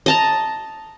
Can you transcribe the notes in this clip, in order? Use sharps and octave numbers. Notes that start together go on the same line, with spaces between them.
D#5 A5 A#5